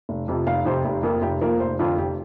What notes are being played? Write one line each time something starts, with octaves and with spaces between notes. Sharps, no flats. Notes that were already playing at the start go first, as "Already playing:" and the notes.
F1
F2 C3 F3
F1 F5
F2 C3 F3 C5
F1 G4
F2 F3 A#3 A#4
F1 G4
F2 F3 A#3 A#4
F1 C5
F2 D3 F4
F1 G4